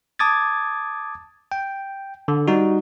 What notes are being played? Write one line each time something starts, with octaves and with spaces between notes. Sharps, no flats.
A5 D6 D#6 G#6 A6
G5
D3
G3 D#4 F#4